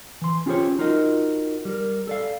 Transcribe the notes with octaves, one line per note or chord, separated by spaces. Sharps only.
E3 C6
C#4 F4 G4 G#4 C5 C#5
D#4 F4 F#4 A#4 D#5
G3 A#4
A4 D5 F5